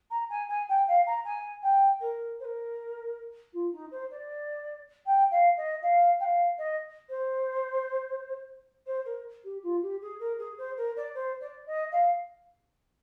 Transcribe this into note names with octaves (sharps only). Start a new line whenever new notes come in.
A#5
G#5
G#5
G5
F5
A#5
G#5
G5
A#4
C5
A#4
F4
D#4
C5
D5
G5
F5
D#5
F5
G5
F5
D#5
C5
C5
A#4
G4
F4
G4
G#4
A#4
G#4
C5
A#4
D5
C5
D5
D#5
F5